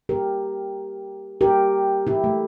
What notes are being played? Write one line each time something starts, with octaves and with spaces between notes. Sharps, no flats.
G4 A#4
G4 A#4
E4 G4
A3